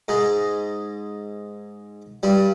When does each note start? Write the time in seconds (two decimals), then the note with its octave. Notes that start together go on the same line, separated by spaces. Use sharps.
0.08 G#2 G#3
2.23 G2 G3